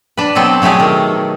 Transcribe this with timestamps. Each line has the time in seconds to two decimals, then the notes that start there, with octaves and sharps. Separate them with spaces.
0.17 D4 B4
0.35 B2 F#3 B3 C4 A4 D5
0.62 B2 F#3 A3 G4 G#4
0.80 D#3